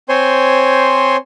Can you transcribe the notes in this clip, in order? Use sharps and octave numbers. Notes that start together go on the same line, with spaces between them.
C4 C5 C#5 G#5 C6